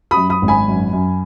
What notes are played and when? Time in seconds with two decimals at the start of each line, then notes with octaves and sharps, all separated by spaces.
0.11 B5 D#6
0.17 F#2
0.30 B5 D#6
0.42 G#1
0.48 G#5 B5
0.68 F#2
0.93 F#2